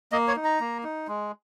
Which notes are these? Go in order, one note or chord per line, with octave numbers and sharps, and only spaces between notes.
A#3 D#5
C#5
D#4
A#5
A#3
D#4
G#3